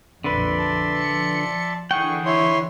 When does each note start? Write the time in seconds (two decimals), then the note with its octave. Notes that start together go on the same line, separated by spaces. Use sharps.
0.24 A#1 F2 D3 B4 D5 E5 C6
0.59 A5
0.96 F3 C#7
1.91 D3 E3 G#4 F#5 G5 C#6
2.25 E4 C#5 C6